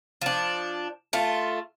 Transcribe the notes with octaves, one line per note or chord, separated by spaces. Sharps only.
F3 D4
A3 F4